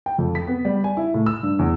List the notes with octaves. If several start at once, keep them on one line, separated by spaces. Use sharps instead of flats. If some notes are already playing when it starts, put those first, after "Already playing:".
G5
F2
B6
B3
G3
G#5
E4
A2
E6
G2
E2